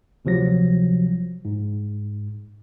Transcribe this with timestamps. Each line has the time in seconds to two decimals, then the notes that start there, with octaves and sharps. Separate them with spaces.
0.25 D2 C3 F3 F#3 A#6
1.45 G#2